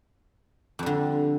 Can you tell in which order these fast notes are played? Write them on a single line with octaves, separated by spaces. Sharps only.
F2 G3 D3